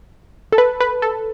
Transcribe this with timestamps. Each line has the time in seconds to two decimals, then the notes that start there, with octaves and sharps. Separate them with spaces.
0.52 A4
0.58 B4
0.81 B4
1.02 A4